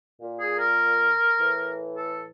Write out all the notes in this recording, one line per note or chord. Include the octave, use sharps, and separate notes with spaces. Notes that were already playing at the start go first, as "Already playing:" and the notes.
A#2
G#4
A#4
A2 E3
A4